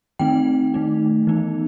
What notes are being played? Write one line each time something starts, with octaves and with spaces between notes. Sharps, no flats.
D#3 A3 C4 D#4 G5
D#3 A3 D#4
E3 B3 D#4